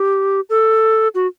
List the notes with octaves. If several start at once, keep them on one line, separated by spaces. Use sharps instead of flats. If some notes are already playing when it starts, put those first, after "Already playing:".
Already playing: G4
A4
F#4